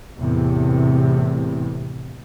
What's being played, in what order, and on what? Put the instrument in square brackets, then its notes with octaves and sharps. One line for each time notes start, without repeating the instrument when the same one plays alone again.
[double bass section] E2 A2 C3